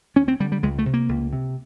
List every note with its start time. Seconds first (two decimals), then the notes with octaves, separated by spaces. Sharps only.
0.16 D2 C#4
0.28 C4
0.40 D3 G3
0.52 G3
0.63 C#2 G#3
0.79 A3
0.86 C3
0.94 A#3
1.09 C#2
1.33 C3